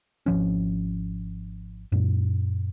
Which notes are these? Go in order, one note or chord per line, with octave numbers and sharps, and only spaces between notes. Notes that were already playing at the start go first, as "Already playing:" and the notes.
G#1 F3 C#4
F#2 A#2